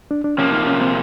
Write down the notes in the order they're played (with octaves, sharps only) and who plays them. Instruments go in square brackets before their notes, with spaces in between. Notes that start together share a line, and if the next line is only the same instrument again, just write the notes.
[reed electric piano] D4
D4
[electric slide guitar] C3 F3 A#3 [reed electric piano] C#4
[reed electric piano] D#4
C#4
C4